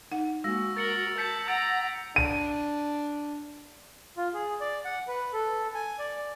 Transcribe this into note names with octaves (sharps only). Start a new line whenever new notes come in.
D#4 F#5
G#3 A#3 F#4 E6 A#6
A#4 A6 C#7 F#7
A5 G6 B6 C#7
F#5 A#5 E6 A6 D7
D4 D#7
F4
G#4
D5
F#5
B4
A4
G#5
D5